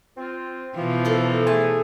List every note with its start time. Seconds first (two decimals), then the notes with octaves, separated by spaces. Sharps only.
0.17 C4 F4
0.76 B2 E3 F3 F4
1.05 A4 A#4
1.47 A3 G#4 G#5 A5